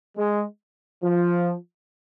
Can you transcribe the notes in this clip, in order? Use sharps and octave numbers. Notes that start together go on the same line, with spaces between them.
G#3
F3